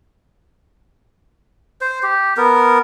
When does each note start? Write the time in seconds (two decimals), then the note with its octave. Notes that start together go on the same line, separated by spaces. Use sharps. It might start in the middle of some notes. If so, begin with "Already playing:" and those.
1.81 C5
2.03 G4
2.37 B3 A#4